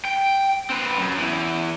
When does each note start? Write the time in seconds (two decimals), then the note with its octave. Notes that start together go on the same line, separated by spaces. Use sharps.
0.05 G5
0.70 C4 B4
0.99 F#2
1.18 E2 E3